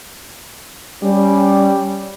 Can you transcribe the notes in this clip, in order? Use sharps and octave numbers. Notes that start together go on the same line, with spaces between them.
G3 C#4